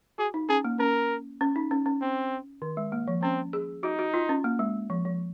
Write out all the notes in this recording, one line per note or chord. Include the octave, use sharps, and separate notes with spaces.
F#4 G#4
D#4
C#4 G#4
A#3
C#4 A#4
C#4
D#4
C#4
C#4
C4
D#3
G#3
A#3
F3
C4 C#4
G#4
D#4 F#4
F#4
F4
C#4
A#3
G#3
F3
F3